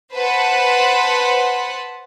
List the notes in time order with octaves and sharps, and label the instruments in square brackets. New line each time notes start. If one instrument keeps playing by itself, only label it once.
[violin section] B4 C5 F#5 A5